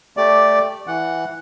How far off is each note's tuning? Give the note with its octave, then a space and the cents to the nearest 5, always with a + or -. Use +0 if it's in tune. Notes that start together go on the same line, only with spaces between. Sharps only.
A3 +0 G4 +0 D5 +0
E3 +0 F#5 +0